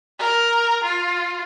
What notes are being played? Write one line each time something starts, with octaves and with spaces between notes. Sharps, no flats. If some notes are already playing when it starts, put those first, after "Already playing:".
A#4
F4